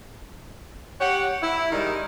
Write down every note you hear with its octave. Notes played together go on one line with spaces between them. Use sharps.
G4 C#5 F#5
E4
D#3 G3 G#3 D#4